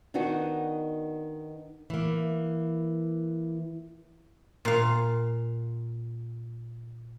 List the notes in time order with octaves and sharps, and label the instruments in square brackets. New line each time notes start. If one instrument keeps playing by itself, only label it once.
[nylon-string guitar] D#3 B3 D4 D#4 F#4
[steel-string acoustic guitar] E3 A#3
[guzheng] A#2 F5